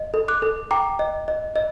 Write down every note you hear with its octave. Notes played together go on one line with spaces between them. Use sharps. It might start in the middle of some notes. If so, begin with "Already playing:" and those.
Already playing: D#5
A4
D6 F#6
A4
G5 A#5 D6
D#5
D#5
D#5